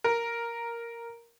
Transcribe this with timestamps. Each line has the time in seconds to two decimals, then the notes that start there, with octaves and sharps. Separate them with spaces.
0.04 A#4